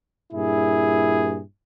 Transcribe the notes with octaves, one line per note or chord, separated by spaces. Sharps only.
G2 A#2 E4 G#4